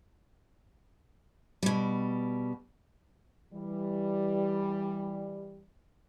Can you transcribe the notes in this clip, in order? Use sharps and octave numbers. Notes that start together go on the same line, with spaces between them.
B2 G3
E3 G3